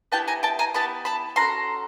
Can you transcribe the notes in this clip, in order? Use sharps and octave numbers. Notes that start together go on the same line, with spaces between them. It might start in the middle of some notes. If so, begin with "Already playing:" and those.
B3 E4 G4 G5 A5
G#5 A#5
G5 A5
G#5 A#5
B3 E4 G4 A5 B5
A5 B5
C#4 F#4 A4 A#5 C6